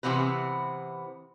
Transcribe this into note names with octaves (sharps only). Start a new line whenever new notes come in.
C3 E3 B3 C4 B4